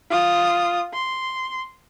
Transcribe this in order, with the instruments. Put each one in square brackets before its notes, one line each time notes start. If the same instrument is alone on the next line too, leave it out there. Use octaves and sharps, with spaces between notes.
[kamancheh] F4 D#6
C6